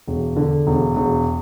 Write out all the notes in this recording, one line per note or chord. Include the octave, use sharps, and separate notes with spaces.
E1
D3
E1
E1